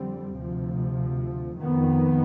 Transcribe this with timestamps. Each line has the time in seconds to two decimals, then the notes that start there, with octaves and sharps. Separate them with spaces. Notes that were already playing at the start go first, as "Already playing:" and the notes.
Already playing: F2 D3 G3 C4
0.37 D2 C3 F3
1.58 F2 D#3 B3